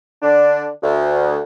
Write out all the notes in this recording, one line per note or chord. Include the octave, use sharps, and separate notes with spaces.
D3 D4
D2